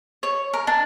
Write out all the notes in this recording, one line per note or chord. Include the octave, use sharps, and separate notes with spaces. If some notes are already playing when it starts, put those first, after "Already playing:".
C#5
A#4
D4